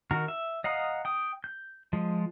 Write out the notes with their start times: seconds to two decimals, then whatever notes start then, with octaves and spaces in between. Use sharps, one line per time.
0.11 D#3 F#4 A#4
0.28 E5
0.64 D#5 F5 F#5 A#5 D#6
1.05 G5 D#6
1.44 G6
1.93 F3 G#3